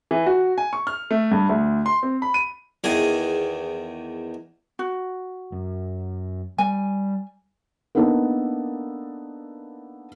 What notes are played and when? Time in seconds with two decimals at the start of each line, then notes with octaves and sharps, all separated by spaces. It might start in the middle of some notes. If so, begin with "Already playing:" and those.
0.11 E3
0.26 F#4
0.58 G#5
0.73 C#6
0.87 F6
1.11 A3
1.32 G2
1.49 D2
1.86 C6
2.03 C4
2.22 B5
2.34 D#7
2.84 E2 D#3 G#4 G#5
4.79 F#4
5.52 F#2
6.58 G3 G#5
7.95 A#3 B3 D4 D#4 A4 A#4